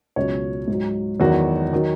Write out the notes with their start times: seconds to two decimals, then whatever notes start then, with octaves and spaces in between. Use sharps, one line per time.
0.16 C#2 B2 F#3 C#5
0.68 G#2 F#3
1.20 E2 D#3 F#3 F#4
1.73 D#3 F#3